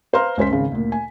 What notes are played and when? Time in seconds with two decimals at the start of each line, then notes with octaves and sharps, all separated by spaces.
0.13 B4 C5 F5 A#5 C6 F6
0.37 C#2 C#4 C5 B6
0.50 G#1 C#3
0.72 D2 A#2
0.92 G#5